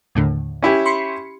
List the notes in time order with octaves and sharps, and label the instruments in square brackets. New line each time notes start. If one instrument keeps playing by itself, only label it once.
[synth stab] D#2 A2 D3
[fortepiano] C#4 E4 G4
[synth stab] B5 C6 C#7